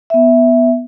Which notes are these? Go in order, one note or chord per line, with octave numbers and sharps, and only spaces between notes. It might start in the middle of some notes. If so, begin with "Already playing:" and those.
B3 E5